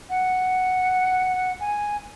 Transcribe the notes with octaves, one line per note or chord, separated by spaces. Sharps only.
F#5
G#5